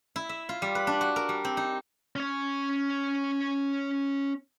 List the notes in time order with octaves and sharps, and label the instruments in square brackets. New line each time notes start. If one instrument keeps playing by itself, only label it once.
[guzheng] E4
E5
F4
G3
B4
D4
F#4
A#4
G3
C4
D#4
[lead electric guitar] C#4 C#5